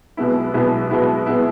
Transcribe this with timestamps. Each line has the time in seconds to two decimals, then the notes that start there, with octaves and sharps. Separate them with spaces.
0.17 B1 B2 G#3 B3 E4
0.54 B1 B2 G#3 B3 E4
0.90 B1 B2 G#3 B3 E4
1.26 B2 G#3 B3 E4